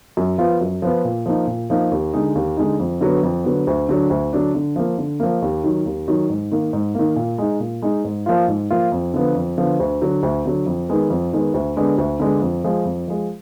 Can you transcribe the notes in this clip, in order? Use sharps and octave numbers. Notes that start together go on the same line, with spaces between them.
F#2
F3 B3 F4
F#2
F3 B3 F4
A#2
F3 A#3 D#4
A#2
F3 A#3 D#4
D#2
D3 G#3 D#4
D#2
D3 G#3 D#4
F2
D3 F#3 B3
F2
D3 F#3 B3
D2
D3 F#3 D4
D2
D3 F#3 D4
D3
F3 A#3
D3
F3 A#3
D#2
D#3 F#3
D#2
D#3 F#3
G#2
D#3 A#3
G#2
D#3 A#3
A#2
G#3 D#4
A#2
G#3 D#4
G#2
F3 A#3 F4
G#2
F3 A#3 F4
F2
D3 F3 B3
F2
D3 F3 B3
D2
D3 F#3
D2
D3 F#3
F2
D#3 G#3 B3
F2
D#3 G#3 B3
D2
D3 G#3 B3 D4
D2
D3 G#3 B3 D4
F2
F3 G#3
F2
F3 G#3